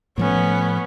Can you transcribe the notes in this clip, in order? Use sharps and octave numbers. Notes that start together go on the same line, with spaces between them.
A2 F3 A3 B3 C#4